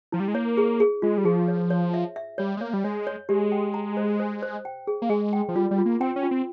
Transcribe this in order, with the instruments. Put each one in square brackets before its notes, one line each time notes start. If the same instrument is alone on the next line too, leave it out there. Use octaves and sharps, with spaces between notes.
[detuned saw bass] F3 [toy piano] E4
[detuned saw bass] G3
G#3
[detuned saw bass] A#3 [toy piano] C#5
[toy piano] G#4
G#4
[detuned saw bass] G#3 [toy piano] F4
[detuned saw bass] G3
[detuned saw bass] F3 [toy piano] G#4
[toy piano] C#5
C#5
E5
E5
[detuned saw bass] G3 [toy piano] C#5
[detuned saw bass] G#3
[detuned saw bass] A#3 [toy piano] C#5
[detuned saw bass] G3
[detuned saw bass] G#3 [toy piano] C#5
[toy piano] C#5
[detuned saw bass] G#3 [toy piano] G4
[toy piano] G5
A#5
C5
C5
C5
G5
G#4
[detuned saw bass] A#3
[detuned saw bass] G#3 [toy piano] G#4
[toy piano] G5
[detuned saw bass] F3
[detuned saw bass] G3 [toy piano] F4
[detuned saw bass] G3
[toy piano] F4
[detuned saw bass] A#3
[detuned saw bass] C4 [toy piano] G5
[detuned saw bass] C#4
[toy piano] F4
[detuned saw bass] C4